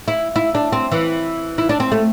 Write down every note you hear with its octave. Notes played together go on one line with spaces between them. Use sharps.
E4
E4
D4
C4
E3
E4
D4
C4
A3